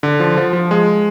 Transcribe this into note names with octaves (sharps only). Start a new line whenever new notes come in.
D3
F3
F3
F3
G#3